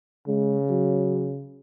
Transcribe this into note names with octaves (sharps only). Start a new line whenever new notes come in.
C#3 G#3
F#3